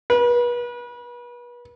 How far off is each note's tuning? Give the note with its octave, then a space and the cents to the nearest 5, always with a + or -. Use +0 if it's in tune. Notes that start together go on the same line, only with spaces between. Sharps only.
B4 -35